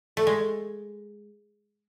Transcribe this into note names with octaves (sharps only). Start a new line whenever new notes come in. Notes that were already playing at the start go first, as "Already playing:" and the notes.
A3
G#3